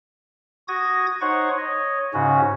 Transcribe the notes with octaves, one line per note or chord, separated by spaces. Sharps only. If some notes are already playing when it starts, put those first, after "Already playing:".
F#4 D#6 G#6 A#6
D#4 C5 C#5 F#5 C#6
C#5 D#5
G#2 C#3 C#4 F#4